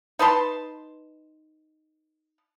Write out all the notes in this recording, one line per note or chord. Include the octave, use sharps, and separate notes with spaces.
D#4 B4 A5 C6